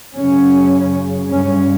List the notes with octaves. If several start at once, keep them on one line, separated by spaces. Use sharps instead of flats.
F#2 C#3 C#4
G2 C#4